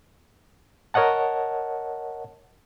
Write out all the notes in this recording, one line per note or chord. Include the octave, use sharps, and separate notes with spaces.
A#4 C#5 D#5 F#5 A5